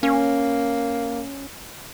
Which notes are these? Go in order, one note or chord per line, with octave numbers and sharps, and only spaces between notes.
A#3 C#4